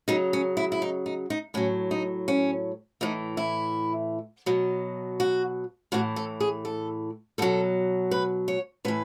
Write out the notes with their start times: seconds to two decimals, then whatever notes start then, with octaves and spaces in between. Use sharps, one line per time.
0.08 C#3 F#3 D#4
0.33 C#4
0.57 E4
0.72 E4
0.82 D#4
1.06 D#4
1.30 D#4
1.54 A2 F#3 C#4
1.91 D#4
2.28 C#4
3.01 A2 E3 D#4
3.37 E4
4.46 B2 F#3
5.20 F#4
5.92 A2 E3 F#4
6.16 A4
6.40 G#4
6.65 A4
7.38 B2 F#3 A4
8.11 B4
8.48 C#5
8.85 A2 E3 B4